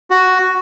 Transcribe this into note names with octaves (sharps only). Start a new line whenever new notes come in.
F#4